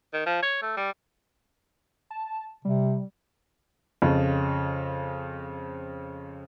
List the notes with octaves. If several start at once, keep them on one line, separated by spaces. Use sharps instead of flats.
D#3
F3
C#5
A3
G3
A5
C3 G3
F2 C#3